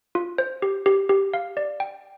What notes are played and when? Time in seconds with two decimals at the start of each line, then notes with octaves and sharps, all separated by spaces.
0.15 F4
0.38 C5
0.62 G4
0.86 G4
1.09 G4
1.34 F5
1.57 D5
1.80 G5